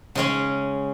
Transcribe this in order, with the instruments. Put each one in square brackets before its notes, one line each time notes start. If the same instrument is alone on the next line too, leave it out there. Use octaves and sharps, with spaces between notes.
[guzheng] C#3 G#3 C#4